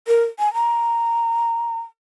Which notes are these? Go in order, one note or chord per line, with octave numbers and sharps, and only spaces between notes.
A#4
G#5
A#5